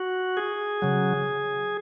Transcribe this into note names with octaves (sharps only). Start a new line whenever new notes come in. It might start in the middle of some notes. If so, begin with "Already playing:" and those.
Already playing: F#4
G#4
C#3 F#3